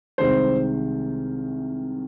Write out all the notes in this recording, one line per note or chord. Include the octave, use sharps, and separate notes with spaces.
C2 C3 D#3 G#3 C5